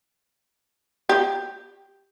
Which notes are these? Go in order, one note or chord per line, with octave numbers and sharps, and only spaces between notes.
G4